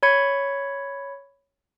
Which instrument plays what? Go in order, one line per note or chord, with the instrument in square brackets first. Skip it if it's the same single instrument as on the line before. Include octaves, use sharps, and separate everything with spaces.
[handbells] C#5 B5 G#6 C#7